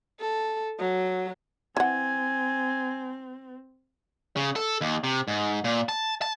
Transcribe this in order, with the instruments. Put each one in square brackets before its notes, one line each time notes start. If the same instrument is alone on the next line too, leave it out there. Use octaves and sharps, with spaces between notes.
[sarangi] A4
F#3
[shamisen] E3 F#5 [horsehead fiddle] C4 [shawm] G#5
[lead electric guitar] C#3
A4
D#2
C3
G#2
A#2
A5
A5